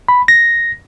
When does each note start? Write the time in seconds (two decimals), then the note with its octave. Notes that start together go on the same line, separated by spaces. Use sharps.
0.09 B5
0.28 A#6